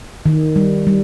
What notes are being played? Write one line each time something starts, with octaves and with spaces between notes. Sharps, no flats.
D#3
G3
G3